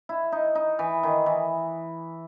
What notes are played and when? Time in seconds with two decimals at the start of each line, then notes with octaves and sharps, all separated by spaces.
0.09 E4
0.32 D#4
0.55 D#4
0.79 E3
1.03 D#3
1.26 E3